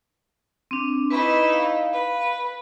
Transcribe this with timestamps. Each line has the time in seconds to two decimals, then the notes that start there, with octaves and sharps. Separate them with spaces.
0.71 C4 D4
1.11 D#4 E4 B4 C#6
1.53 F5
1.93 B4